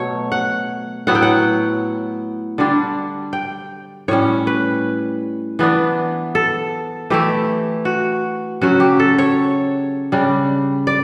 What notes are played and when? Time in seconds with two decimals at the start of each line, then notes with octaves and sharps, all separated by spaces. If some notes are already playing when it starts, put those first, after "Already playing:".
Already playing: B2 F#3 A3 C#5
0.32 F#5
1.07 A2 F#3 B3 E4 F#5
1.15 G5
1.22 F#5
2.58 D3 G3 D4
3.33 G5
4.08 A2 G3 C#4 C#5
4.47 B4
5.59 E3 B3 D4
6.35 A4
7.10 E3 A3 E4 G4
7.85 F#4
8.61 C#3 F#3 C#4 F#4
8.80 G4
9.00 A4
9.18 C#5
10.12 C#3 G3 D4
10.87 D5